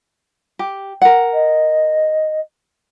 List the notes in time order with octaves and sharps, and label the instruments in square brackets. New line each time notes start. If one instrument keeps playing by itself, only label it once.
[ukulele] G4
A#4 F#5
[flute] D#5